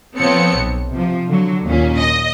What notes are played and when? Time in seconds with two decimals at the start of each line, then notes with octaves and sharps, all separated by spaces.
0.18 F3 B3 C4 A4 C#5 C#7
0.55 B1
0.92 C3 F3
1.29 D3 F#3
1.64 D#2 A#2 C#4
1.98 D#5